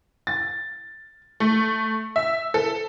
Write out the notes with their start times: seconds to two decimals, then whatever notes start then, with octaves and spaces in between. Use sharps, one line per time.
0.27 A6
1.40 A3
2.16 E5
2.54 A4